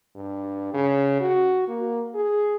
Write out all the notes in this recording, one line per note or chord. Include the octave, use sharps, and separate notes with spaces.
G2
C#3
F#4
A#3
G#4